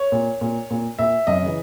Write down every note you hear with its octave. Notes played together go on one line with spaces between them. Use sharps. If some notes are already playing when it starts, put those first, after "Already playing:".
Already playing: C#5
A#2
A#2
A#2
A#2 E5
F#2 D#5
C#3 E3